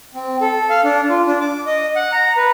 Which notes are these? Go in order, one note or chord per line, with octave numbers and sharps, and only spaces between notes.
C4
A4
F5
D4
F4
D4
D6
D#5
F#5
A#5
B4